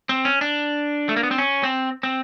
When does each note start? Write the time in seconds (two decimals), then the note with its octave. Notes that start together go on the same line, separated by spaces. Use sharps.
0.09 C4
0.25 C#4
0.41 D4
1.09 A3
1.16 A#3
1.23 B3
1.31 C4
1.38 C#4
1.63 C4
2.03 C4